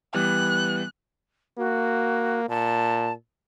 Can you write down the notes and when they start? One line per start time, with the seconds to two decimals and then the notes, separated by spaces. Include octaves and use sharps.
0.14 E3 G3 B3 F#6
1.58 A#3 F#4
2.49 A#2 A5